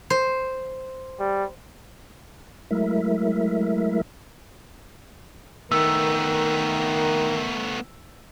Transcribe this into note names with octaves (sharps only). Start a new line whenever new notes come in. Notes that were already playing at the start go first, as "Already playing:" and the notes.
C5
G3
F#3 G#3 A3 E4 A#4 E5
D#3 A3 B3 A#4 E6